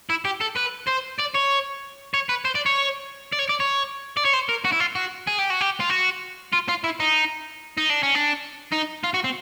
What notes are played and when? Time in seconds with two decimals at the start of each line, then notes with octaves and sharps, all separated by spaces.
0.09 E4
0.25 G4
0.41 A4
0.57 B4
0.88 C5
1.19 D5
1.35 C#5
2.14 C#5
2.29 B4
2.45 C5
2.55 D5
2.66 C#5
3.32 D5
3.39 C#5
3.49 D5
3.60 C#5
4.17 D5
4.25 C#5
4.33 C5
4.49 A#4
4.64 F#4
4.72 E4
4.80 F4
4.95 F#4
5.27 G#4
5.38 G4
5.50 F#4
5.61 G4
5.80 F4
5.89 F#4
6.53 F4
6.68 F4
6.84 E4
7.00 D#4
7.78 D#4
7.90 D4
8.03 C#4
8.15 D4
8.72 D#4
9.04 F4
9.14 F#4
9.24 C4